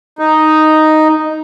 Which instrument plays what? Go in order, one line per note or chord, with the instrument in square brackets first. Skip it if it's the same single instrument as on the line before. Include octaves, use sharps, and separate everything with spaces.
[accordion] D#4